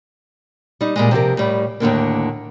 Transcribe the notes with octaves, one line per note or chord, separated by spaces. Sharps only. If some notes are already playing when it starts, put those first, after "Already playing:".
G3 D#4
A#2 G3 G#3
C3 F3 G4 A#4
A2 G3
D#2 A2 D3 A#3